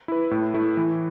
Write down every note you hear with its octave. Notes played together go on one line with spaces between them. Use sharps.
E4 B4
A2
A3 E4
E3